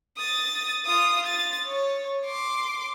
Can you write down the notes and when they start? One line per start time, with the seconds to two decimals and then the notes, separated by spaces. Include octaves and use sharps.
0.17 D#6 A6
0.86 F4 D#6
1.26 A6
1.66 C#5
2.26 C6 D6